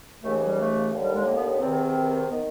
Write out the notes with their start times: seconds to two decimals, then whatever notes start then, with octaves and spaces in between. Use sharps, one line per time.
0.23 D#2 C#3 E3 A3
0.46 G3
0.58 A3
0.92 D#2 D3
1.03 G3
1.14 G#3
1.26 A#3
1.36 B3
1.48 B3
1.59 E2 C3 D#3 C4
2.28 D#3 B3